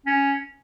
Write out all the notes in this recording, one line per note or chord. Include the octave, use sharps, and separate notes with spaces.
C#4